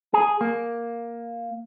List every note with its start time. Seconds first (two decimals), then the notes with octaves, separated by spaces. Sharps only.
0.14 G#4
0.41 A#3